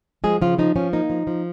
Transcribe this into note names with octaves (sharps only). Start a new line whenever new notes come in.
F3 G#3 G#4
C#3 F3 F4
F3 D#4
F3 C#4
A#3 D#4
F3
F3